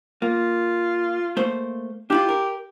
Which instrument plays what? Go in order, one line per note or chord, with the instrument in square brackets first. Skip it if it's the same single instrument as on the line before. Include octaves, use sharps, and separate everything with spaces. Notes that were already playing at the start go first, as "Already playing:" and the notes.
[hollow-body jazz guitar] A#3 [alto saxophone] F4
[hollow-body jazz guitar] A3 A#3 C5
[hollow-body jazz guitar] D4 E4 F4 [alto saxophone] G4
[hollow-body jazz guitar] A#4